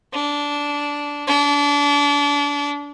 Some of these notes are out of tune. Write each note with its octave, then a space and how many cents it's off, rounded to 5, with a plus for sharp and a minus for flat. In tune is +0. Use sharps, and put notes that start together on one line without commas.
D4 -15
D4 -30